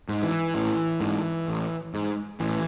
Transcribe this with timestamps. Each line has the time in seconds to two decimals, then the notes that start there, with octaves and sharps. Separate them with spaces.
0.09 G#2
0.23 E3
0.55 A1
1.01 G#2
1.48 A1
1.94 G#2
2.40 A1 E3